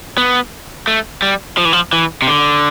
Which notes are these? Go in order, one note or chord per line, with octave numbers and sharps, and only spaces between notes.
B3
A3
G3
F3
E3
F3
E3
C3
D3